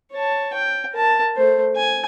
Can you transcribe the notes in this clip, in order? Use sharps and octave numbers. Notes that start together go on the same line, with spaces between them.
C#5 A5
G5
A#4 A5
A3 C5
G#5